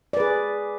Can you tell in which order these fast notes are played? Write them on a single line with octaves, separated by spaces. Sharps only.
D5 B4 G#4